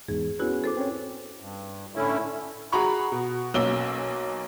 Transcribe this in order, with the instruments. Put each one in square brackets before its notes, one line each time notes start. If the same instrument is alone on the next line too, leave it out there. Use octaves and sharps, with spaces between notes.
[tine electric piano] E2 G#2 [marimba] G#4
[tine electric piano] B3 C#4 B4 [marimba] E4 F#4 G#4
[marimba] A4 C5 D6
[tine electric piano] C4 C#4 C#5
[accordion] G2
A2 D3 A3 C#4 E4
[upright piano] F#4 G#4 A#5 B5 C#6
B2
B1 A#3 C#4 E6 G7